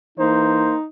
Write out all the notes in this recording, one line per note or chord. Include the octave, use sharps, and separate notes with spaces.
E3 A#3 D#4 C5